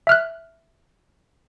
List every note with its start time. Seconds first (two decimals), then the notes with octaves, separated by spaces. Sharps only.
0.07 E5 F6 F#6